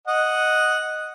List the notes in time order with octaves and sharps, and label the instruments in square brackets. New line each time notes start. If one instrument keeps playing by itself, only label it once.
[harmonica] D#5 F#5